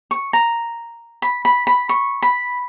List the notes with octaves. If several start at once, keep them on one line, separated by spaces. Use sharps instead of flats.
C#6
A#5
B5
B5
B5
C#6
B5